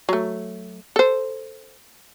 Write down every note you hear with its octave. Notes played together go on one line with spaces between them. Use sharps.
F#3 A3
A4 C5